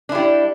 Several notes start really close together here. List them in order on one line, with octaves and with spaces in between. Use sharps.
D4 E4 G3